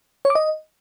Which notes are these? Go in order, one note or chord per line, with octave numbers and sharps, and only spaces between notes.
C#5
D6
D#5